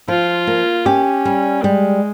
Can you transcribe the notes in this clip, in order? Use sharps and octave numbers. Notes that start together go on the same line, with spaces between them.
F3 F4
A#3
C#4 G4
G3
G3 G#3